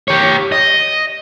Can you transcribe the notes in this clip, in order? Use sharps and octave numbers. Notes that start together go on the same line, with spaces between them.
G4 C#5
D#5